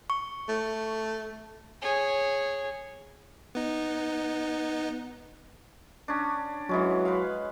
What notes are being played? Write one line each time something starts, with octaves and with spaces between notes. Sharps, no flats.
C#6
A3
G#4 C#5
B3 D#4
C#4 D4
E3 F#3 G#3 C#4
B4 F5